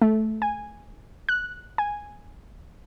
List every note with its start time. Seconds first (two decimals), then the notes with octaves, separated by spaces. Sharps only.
0.02 A3
0.42 G#5
1.29 F#6
1.78 G#5